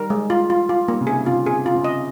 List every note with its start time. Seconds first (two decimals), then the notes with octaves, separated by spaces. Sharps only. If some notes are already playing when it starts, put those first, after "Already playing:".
Already playing: D#3 G3 A#4
0.10 G#3
0.30 F4
0.50 F4
0.69 F4
0.88 D#3 G3 A#3
1.01 C#3
1.07 C3 D#3 G#4
1.26 C#3 F4
1.46 C3 G#4
1.66 F4
1.75 C#3
1.85 D#5